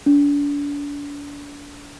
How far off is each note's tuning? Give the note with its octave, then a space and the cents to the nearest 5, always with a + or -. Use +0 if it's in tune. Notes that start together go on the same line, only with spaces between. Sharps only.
D4 -35